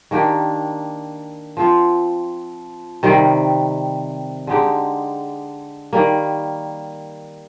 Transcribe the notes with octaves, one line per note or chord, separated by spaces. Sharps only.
D#3 A#3 D4 G4
F3 C4 F4
C3 D#3 G3
D3 G#3 D#4 G4
D#3 G3 A#3